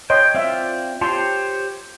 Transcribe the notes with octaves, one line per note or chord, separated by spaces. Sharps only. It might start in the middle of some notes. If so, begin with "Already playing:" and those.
C#5 D#5 G5 C6
C4 F4 C#5 D5 E5
F4 G4 C5 C#5 A5 C6